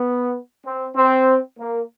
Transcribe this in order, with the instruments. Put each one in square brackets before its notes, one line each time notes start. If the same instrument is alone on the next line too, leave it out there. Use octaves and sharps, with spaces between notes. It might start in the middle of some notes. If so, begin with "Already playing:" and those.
Already playing: [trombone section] B3
C4
C4
A#3